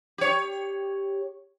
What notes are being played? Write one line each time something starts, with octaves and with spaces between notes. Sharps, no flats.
G4 C#5